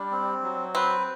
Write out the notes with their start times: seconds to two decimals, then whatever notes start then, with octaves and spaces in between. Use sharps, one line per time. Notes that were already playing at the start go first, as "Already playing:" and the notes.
Already playing: G3 D4
0.11 C4
0.43 F#3
0.75 C4 B4